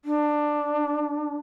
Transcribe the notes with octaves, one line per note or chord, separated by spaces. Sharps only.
D4